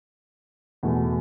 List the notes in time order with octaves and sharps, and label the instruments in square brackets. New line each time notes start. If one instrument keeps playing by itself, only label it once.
[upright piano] E2 B2 A3